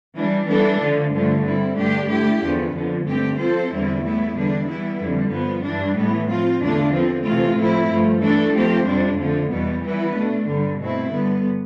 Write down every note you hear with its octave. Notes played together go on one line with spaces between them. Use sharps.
E3 G3 D4
E3 G3 B3 D4 A4
D3 F3 A3
G2 D3 F3 A3
G3 C4 E4
G2 D3 A3 D4 G4
D3 A3 E4 G4
E2 D3 F3 B3
F2 D3 F3
G2 D3 A3 C4 G4
F3 C4 F4 A4 C5
E2 D3 G3 C4 E4
A2 G3 B3 E4
E2 D3 G3 B3 D4
E3 G3 B3 E4
F2 D3 G3
G2 F3 B3
G2 E3 G3 D4
A2 E3 B3
F3 C4 F4
E2 D3 A3 D4 F4
D3 F3 C4
C3 E3 A3 C4 F4
A2 F3 A3 C4 E4
G2 F3 A3
E3 A3 D4 A4
F3 A3 C4 G4 C5
F2 C3 G3 D4
D3 F3 A3
E2 B2 G3 B3
E3 G3 B3 E4 B4
B2 A3 D4
G2 D3 G3
B2 A3 C4 E4
G2 D3 G3 B3